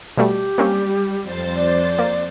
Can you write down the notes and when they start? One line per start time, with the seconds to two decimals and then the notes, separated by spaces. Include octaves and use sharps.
0.17 B2 G3 A3 G4
0.58 G3 A#3 C4 C#4
1.23 F2 C5 A6
1.56 D5
1.99 A#3